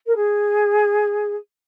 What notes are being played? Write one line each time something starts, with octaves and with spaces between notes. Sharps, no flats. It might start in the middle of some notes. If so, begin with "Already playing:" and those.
A#4
G#4